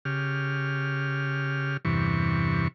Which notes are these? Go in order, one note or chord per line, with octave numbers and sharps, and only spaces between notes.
C#3 G4 F6
E2 G2 C3 E3 C#6